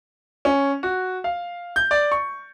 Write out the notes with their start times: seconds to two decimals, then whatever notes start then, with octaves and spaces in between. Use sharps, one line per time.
0.45 C#4
0.83 F#4
1.24 F5
1.76 G6
1.91 D5
2.12 C#6